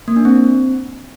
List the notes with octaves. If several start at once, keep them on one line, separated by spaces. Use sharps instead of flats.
A#3
D4
C4